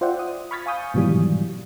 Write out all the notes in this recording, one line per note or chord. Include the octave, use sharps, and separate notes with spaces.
F4 C5 D5 E5 F#5 G5
D#6
B5 C#6 F6 G#6 A6 B6
F5 G#5 C#6 D#6 G6
G#2 B2 D#3 E3 F#3 G3